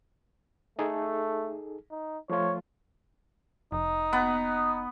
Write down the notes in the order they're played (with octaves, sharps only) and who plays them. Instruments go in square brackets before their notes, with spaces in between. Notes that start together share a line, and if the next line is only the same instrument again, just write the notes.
[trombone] A3 [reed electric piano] D#4 G#4 A4
[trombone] D#4
[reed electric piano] F3 A3 F4 [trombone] C#5
[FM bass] F1 [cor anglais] D#4
[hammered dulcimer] B3